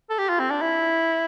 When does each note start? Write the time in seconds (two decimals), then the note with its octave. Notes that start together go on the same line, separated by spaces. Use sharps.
0.10 A4
0.19 G4
0.29 F4
0.40 C4
0.51 D4
0.61 E4